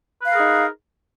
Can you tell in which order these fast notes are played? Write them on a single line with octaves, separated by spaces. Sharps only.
B4 F5 A#4 G#4 D#4